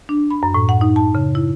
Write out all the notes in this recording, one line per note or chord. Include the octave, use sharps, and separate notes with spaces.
D4
B5
F#2
A2
F#5
D#4
A5
C#3
E4